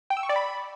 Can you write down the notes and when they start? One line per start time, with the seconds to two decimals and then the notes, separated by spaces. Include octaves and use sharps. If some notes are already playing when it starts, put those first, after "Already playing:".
0.10 G5
0.17 E6
0.23 C#6
0.29 D5
0.36 B5